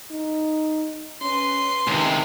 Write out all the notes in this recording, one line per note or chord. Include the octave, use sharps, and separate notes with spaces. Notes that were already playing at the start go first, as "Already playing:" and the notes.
D#4
C#4 B4 C6
C#2 C3 D#3